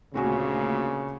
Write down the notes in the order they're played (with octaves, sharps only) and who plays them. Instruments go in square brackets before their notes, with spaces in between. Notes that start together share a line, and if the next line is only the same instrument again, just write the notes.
[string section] D2 A#2 [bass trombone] C#3 [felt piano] C4 F#4 G#4